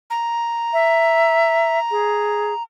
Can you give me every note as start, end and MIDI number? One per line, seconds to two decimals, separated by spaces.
0.10 2.63 82
0.73 1.79 76
1.91 2.54 68